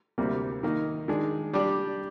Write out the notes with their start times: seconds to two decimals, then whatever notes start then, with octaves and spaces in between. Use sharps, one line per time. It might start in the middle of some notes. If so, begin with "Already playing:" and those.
0.18 D2 C3 G3 A#3
0.63 D#3 A#3 D#4
1.08 D#3 G#3 D4
1.53 G3 D4 G4 D5